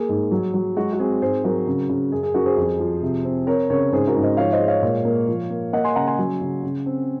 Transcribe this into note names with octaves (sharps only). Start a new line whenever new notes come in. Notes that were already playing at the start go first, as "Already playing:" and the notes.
Already playing: A#3 G#4
G#2
F#3
F#3
G#3 F#4
F#4
C4 G#4
G#2 G#4 C5
F#3 F#4 A#4
C#3
C#3
F#2 G#4
G#4
F#2 F#4 A#4
G#4 C5
F2
F3
C3
C4
C4 A#4 C#5
C#3 A#4 C#5
G#2 G#4 C5
F#4 A#4
G#2
C5 D#5
F3 C#5 F5
C5 D#5
G#3
C#5 F5
A#2
A#3
F3
A#3
A#3 D#5 F#5
G#5 C6
C#3 F#5 A#5
G#5 C6
F#3
C#3
C#3
C4